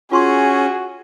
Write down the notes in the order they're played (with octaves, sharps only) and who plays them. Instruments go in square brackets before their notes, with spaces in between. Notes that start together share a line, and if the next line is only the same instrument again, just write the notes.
[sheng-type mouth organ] C#4 [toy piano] F4 C6 C#6 [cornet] F#4 [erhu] G#4